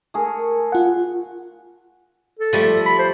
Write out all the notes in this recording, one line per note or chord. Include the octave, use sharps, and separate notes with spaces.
A3 G#4 A#4
F4 F#5
A4
F3 G3 A3
B5
C5